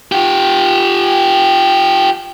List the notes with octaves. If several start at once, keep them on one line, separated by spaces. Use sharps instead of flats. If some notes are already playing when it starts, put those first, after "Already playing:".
F4 G4